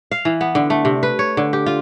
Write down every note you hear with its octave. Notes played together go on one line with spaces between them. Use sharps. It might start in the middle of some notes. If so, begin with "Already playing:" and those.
F5
E3
B3
D3
A3
C3
B4
C#5
D3
G4
F4